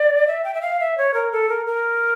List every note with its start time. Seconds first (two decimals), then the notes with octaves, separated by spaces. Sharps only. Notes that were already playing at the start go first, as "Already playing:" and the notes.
Already playing: D5
0.27 E5
0.44 G5
0.54 E5
0.62 F5
0.80 E5
0.98 C#5
1.14 A#4
1.32 A4
1.49 A#4
1.67 A#4